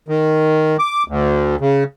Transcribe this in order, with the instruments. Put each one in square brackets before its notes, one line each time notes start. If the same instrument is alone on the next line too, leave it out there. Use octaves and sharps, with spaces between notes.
[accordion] D#3
D6
D2
C#3